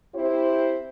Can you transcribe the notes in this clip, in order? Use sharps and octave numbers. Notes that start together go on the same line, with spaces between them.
C4 E4 G4 C5